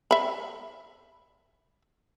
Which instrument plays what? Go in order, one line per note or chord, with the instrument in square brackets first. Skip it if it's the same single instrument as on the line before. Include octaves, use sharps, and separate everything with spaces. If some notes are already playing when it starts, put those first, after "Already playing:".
[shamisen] E5 B5